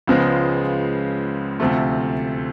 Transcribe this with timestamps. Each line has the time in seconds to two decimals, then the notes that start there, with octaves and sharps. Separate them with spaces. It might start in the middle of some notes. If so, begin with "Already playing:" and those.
0.07 C#2 C#3 F3 G#3 B3
1.60 D2 C3 F3 A3